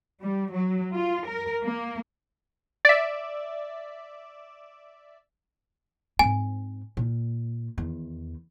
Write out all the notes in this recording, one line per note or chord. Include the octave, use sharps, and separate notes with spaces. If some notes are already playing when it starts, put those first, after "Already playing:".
G3
F#3
F4
A#4
A#3
D5 E5
G#2 C4 G#5
A#2
E2 D#3